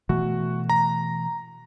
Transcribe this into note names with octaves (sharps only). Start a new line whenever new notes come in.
B2 E3 A3 F#4
A#5